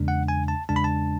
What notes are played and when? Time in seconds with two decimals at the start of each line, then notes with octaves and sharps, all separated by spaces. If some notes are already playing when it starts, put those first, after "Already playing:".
Already playing: E2 C#3 G#3 D4
0.08 F#5
0.28 G#5
0.48 A5
0.69 E2 C#3 G#3 D4 A5
0.76 B5
0.84 A5